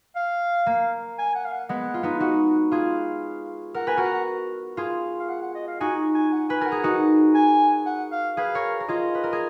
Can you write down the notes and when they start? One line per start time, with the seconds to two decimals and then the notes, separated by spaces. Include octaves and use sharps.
0.16 F5
0.66 A#3
1.19 G#5
1.35 F#5
1.45 F5
1.52 F#5
1.69 G#3 B3 F#5
1.94 F4
2.03 B3 D#4
2.20 D#4 F#4 F#5
2.71 F4 G#4 F5
3.74 A#4 F#5
3.87 B4 G#5
3.97 F#4 A#4 F#5
4.13 F#5
4.77 F4 G#4
5.20 F5
5.29 F#5
5.42 F#5
5.55 D#5
5.68 F5
5.81 D#4 F#4 G#5
6.15 G#5
6.32 F#5
6.49 B4 G#5
6.61 A#4 G#5
6.66 F#5
6.72 G#4
6.83 D#4 F#4
7.35 G#5
7.86 F#5
8.12 F5
8.37 G#4 B4 F5
8.55 A#4 C#5
8.80 A#4
8.89 F4 G#4 D#5
9.15 B4
9.24 A#4
9.33 G#4